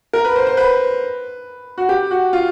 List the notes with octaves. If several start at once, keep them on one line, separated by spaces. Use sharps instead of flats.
A#4
B4
C5
C5
B4
F#4
G4
F#4
F4